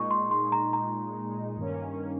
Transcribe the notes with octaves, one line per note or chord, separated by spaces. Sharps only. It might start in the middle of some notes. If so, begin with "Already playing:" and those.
Already playing: A#2 G#3 D#4 C#6
C6
C6
A#5
A#5
G2 D#3 A#3 C#4